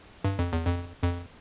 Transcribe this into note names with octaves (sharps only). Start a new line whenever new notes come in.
G2
F2
E2
F2
F2